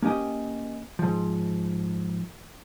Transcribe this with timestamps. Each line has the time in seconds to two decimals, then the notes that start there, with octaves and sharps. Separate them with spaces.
0.03 A#3 C#4 G4 D#5 G5
0.99 G#2 F3